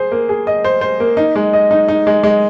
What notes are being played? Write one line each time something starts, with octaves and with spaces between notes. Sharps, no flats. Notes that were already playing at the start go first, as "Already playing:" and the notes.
Already playing: G#4 C5
A#3
G#4
D#5
C5
C5
A#3
D#4
G#3
D#5
D#4
D#4
G#3
G#3